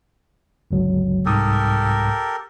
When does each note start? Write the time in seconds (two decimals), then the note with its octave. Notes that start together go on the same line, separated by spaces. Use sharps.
0.71 G1 C#2 F#3
1.26 C2 G#2 G4 A4 A#4 D#6